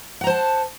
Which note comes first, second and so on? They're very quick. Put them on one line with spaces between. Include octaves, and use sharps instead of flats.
F#5 A#5 C5 A5